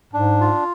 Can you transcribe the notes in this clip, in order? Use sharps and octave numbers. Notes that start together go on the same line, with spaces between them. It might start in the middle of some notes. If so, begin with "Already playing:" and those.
G#2 D4
F4